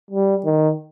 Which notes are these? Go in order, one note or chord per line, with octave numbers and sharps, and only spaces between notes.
G3
D#3